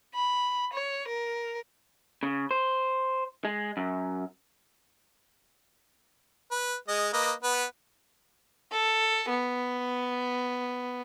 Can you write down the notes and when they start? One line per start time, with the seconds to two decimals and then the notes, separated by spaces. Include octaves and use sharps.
0.14 B5
0.73 C#5
1.08 A#4
2.23 C#3
2.51 C5
3.45 G#3
3.77 F#2
6.51 B4
6.88 G#3 D#5
7.13 A#3 B4 D#5
7.43 B3 B4
8.71 A4
9.29 B3